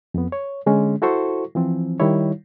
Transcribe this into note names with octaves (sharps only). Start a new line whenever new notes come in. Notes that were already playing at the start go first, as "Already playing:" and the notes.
F2 B3
C#5
D3 G#3 C#4
E4 F#4 A4 C5 C#6
E3 F3 C4
D#3 G3 D#4 E4 C#5